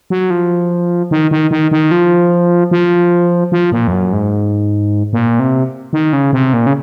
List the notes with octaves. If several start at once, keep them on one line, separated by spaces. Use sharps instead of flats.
F#3
F3
D#3
D#3
D#3
D#3
F3
F3
F3
A#2
F2
F#2
G#2
A#2
C3
D#3
C#3
C3
A#2
C#3